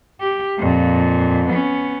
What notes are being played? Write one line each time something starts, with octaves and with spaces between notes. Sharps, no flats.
G4
F2 A#2
B3 C#4